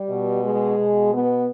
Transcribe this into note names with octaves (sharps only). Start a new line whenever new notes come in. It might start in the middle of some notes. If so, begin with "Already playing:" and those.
Already playing: G3
B2
G#3
B2
B3